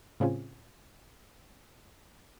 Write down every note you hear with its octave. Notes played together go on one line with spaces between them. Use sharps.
A2 C#3 C4 C#4 F4 G#4